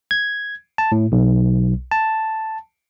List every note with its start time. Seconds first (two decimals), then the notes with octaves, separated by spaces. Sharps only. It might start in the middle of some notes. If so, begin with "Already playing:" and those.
0.11 G#6
0.78 A5
0.92 A2
1.12 B1
1.91 A5